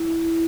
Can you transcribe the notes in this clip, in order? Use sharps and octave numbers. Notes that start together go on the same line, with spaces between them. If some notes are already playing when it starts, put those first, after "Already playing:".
Already playing: E4